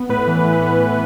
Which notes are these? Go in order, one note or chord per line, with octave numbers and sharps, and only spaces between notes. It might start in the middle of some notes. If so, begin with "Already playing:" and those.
Already playing: B3
A2 B4
E3
A2
B3
A2